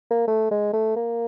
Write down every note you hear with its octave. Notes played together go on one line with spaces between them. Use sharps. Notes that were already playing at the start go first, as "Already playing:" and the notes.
A#3
A3
G#3
A3
A#3